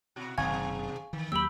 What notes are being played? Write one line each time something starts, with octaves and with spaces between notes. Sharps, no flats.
B2 E4 F#4
F#1 G#2 B2 D#3 F5 G#5 C#6 G#6
D#3 E3
D#2 F#3 A#3 G4 B5 E6